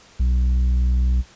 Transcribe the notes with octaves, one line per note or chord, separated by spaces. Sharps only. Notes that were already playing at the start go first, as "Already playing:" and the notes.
B1